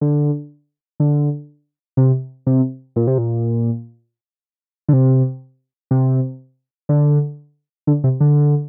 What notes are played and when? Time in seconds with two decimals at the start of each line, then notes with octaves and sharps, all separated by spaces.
0.01 D3
1.00 D3
1.97 C3
2.47 C3
2.96 A#2
3.07 C3
3.18 A#2
4.89 D3
4.93 C3
5.91 C3
6.89 D3
7.87 D3
8.04 C3
8.20 D3